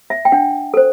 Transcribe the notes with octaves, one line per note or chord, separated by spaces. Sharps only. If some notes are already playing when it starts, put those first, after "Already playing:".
E5
G5
D4 F#5
A4 C5